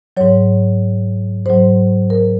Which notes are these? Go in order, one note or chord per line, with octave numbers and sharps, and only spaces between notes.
G#2 F#3 C#5
G#2 F#3 C5
A#4